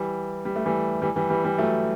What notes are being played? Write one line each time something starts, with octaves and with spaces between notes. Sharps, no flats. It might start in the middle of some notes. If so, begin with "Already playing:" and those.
Already playing: E3 G3
G3
A3
E3 G3
E3 G3
E3 G3
E3 G3
E3 G3
F#3 A3